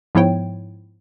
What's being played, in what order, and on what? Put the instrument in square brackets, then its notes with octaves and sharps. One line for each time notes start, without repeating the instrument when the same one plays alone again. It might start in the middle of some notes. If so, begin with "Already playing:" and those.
[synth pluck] G#2 F3 B3 E4 C#5 G5